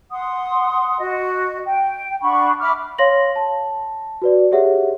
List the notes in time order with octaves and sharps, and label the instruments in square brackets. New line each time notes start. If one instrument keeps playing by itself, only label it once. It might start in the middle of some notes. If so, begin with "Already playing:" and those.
[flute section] F#5 C6 D#6
F#4 D#5
G5
D4 F#5 B5 C#6
E5 B5 D6 F6
[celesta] C#5 F5 C6 A#6 F#7
A5
F#4 B4 D5
G4 G#4 C#5 E5 F#5